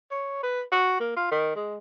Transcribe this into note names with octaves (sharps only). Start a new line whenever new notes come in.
C#5
B4
F#4
A#3
F4
D#3
G#3